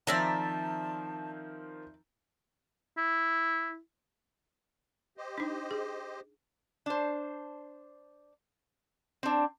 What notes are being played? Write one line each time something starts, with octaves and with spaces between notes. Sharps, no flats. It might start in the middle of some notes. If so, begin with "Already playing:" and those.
D#3 F3 C4 D5 E5 A5 A#5
E4
G4 C5 D#5
D4 D#4
G#4
D4 C5
C4 D4